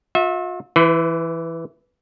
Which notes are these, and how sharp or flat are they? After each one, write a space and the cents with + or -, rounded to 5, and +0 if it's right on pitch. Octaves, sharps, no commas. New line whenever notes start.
F4 +45 E5 -25
E3 +0 B4 +45